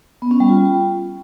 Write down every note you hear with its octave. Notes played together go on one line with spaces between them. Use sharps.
B3
C#4
G3
F4